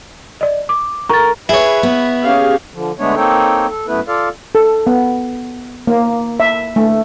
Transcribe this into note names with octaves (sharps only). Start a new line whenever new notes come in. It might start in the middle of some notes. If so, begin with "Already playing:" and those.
D5 D#5
D6
A#4 C#6 A6
E4 G#4 B4 C#5
B3
C#4 G4 G#4 F5
D3 F3
D3 G#3 A3 B3 D4 C#5
A#3 C4 D#4 A4 C#5 G5
A4
F#2 A3 B3 E4 B4
F4 A4 D5 F5
A4
B3
A#3
E5
A3